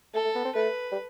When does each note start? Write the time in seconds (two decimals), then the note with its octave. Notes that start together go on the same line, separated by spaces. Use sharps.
0.14 A3 A4
0.24 A3
0.35 B3
0.45 C4
0.55 A3 B4
0.92 G3